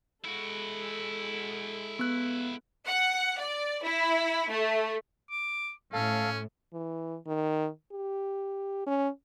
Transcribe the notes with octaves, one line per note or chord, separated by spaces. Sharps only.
G#3 E4 F#4 A4
B3 F#6
F#5
D5
E4
A3
D6
A2 C#4 A4 F5
E3
D#3
G4
C#4